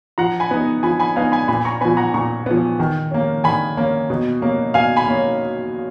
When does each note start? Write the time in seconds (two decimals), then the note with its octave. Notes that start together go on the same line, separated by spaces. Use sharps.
0.18 F3 F#5 A#5
0.40 G#5 B5
0.51 B3 D#4
0.83 F3 G#5 B5
1.00 G#5 B5
1.16 B3 D#4 F5 G#5
1.32 G#5 B5
1.48 A#2 G#5 B5
1.65 A#5 C#6
1.81 F3 B3 G#5 B5
1.97 F#5 A#5
2.14 A#2 A#5 C#6
2.46 F3 B3
2.80 D#3
3.11 A#3 C#4
3.44 D#3 G#5 B5
3.77 A#3 C#4
4.10 B2
4.42 A#3 C#4
4.74 B2 F5 G#5
4.96 G#5 B5
5.07 A#3 C#4